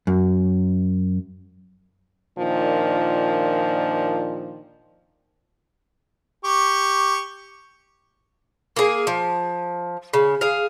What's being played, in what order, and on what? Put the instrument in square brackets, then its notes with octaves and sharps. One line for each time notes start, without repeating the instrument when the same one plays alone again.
[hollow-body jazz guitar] F#2
[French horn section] A#2 D#3 F3 D4
[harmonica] G4 C#6
[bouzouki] A#3 G#4
F3
C#3
G#4 F5